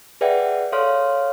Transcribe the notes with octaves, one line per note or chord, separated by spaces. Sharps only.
G#4 B4 D5 E5 F#5 G5
A4 C#5 F5 C6 F6